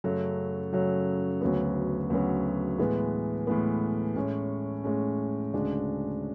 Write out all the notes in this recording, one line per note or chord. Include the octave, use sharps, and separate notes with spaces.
F#2 C#3 F#3 A3
F#2 C#3 F#3 A3
D2 C#3 F#3 B3
D2 C#3 F#3 B3
A2 E3 G#3 B3
A2 E3 G#3 B3
A2 G#3 C#4
A2 G#3 C#4
D2 C#3 G#3 D4